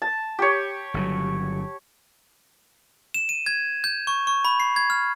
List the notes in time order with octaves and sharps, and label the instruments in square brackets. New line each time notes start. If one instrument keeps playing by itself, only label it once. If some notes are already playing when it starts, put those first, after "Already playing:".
[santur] A5
G4 C#5
[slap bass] G1 C#3 F#3
[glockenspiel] E7
D#7
G#6
G6
C#6
C#6
B5
C7
G#6
F6